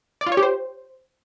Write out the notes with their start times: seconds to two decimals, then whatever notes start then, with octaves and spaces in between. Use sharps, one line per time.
0.21 D5
0.26 F4
0.32 C#5
0.37 G4
0.43 C5